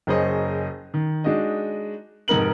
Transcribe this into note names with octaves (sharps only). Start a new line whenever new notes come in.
F#1 F#2 G#4 C5 C#5 D#5
D#3
G#3 D4 D#4 F#4 D#5
F1 G#2 D#4 A#4 F#7